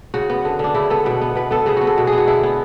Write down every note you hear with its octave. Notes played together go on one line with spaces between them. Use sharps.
C#3 F#4
B3
D3
D3 D4
C#3 E4
B3 A4
B2 B4
B3
B2 B4
B3 A4
C#3 G#4
B3 F#4
A4
B2
G#4
B3 F#4
D3 E4
B3